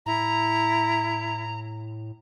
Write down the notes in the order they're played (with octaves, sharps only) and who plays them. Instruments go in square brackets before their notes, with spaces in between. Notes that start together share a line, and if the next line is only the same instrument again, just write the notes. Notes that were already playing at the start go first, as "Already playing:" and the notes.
[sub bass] A2 [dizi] E4 [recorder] A#5